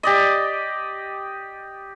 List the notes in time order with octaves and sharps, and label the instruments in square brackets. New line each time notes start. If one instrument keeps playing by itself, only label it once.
[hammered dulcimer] G4 D5 D#5